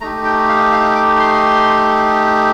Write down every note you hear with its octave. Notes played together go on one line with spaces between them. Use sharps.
A3 D#4 G4 A#5
G5
F5
F5
D6
C6